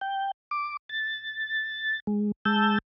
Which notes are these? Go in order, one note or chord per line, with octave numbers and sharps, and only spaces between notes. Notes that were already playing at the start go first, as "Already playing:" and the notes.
G5
D6
A6
G#3
G#3 A5 E6 G6